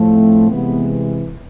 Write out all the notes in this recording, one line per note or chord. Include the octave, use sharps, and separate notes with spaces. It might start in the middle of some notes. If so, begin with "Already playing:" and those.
Already playing: A2 F3 A3
C4
C3 E3 G#3 B3